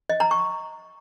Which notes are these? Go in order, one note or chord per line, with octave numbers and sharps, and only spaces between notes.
D#5
A#5
C#6